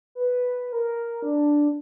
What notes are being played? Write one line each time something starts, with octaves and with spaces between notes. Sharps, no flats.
B4
A#4
D4